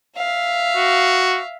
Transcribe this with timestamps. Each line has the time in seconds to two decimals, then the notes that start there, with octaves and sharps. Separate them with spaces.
0.17 E5 F5
0.77 F#4